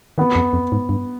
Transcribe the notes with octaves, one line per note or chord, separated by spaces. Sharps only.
D#3 B3
F2
F2
G#2
G2